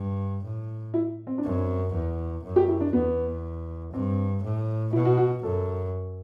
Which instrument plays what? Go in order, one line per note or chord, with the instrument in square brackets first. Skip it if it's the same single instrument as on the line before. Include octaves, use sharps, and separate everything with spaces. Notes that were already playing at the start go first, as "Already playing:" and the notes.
Already playing: [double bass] G2
A2
[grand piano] E4
C4
D4
[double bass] F#2 [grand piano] C4
[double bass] E2
F#2
[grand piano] G4
E4
D4
[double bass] E2 [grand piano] B3
[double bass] G2 [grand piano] C4
[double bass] A2
[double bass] B2 [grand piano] E4
[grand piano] F#4
F#4
F#4
[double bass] F#2 [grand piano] A4